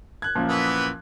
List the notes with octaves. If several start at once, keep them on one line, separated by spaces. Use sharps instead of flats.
F#6 G#6
F#2 A#2 F3
E3 B3 B4